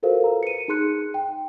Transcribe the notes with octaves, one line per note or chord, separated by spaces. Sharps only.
F4 F#4 A4 A#4 C5 F5
B4 A#5
C#7 D#7
D#4 G#4 C6 F#6 C#7
G5